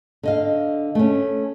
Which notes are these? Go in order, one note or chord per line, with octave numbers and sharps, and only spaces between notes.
D3 D#5 F5
A3 C#4